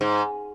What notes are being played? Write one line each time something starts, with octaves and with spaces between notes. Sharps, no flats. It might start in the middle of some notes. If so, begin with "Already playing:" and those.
G#2